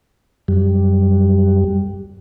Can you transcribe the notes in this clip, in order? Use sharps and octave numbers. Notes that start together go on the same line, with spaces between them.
F#2 G3